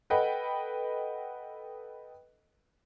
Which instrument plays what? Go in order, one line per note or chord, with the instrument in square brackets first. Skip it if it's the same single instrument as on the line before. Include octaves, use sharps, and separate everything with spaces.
[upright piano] A4 B4 D#5 F#5 G5